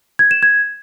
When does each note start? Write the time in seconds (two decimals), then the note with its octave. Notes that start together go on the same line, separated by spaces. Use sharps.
0.19 G#6
0.31 E7
0.43 G#6